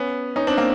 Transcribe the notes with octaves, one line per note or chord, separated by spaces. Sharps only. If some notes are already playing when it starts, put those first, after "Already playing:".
Already playing: B3 C#4
C#4 D#4
C4 D4
A#3 C4